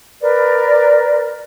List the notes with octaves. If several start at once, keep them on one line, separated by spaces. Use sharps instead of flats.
A#4 B4 D5